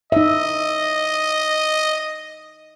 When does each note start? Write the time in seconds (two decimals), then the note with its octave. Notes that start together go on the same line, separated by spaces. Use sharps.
0.12 D#4 D#5 E5